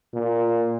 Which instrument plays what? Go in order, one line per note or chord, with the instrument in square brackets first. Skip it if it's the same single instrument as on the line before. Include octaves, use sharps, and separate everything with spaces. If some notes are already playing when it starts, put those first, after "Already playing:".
[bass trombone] A#2